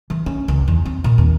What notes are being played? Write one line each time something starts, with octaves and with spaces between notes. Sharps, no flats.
E3
C#4
C#2
E2
C4
A#2
D#2